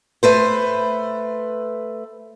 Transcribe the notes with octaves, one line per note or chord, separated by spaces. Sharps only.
A3 B4 C5